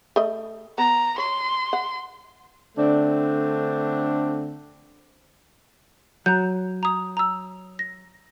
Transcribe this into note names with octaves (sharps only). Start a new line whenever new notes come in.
A3 D#5
B3 A#5
C#5 C6
F#5
D3 A3 C4 D4
F#3 A#5 G6
A#5 D#6
A#5 E6
A#6